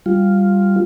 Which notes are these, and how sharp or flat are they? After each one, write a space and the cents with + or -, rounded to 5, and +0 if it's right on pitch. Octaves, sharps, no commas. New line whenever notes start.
G3 +0 F4 +0